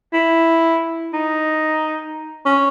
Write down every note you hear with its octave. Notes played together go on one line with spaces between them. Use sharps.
E4
D#4
C#4